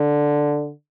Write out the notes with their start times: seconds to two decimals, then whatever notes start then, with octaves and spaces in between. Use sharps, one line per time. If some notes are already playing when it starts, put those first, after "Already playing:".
Already playing: D3